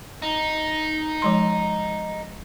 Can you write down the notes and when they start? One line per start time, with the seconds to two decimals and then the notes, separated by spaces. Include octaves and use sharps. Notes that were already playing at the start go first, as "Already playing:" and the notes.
0.22 D#4
1.22 F3 G#3 C6